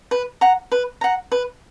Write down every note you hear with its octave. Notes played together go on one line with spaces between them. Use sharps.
B4
F#5 A#5
B4
F#5 A#5
B4